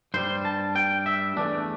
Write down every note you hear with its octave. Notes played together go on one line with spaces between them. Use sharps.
G2 G3 C5
A5
G5
E5
E2 E3 A3 D4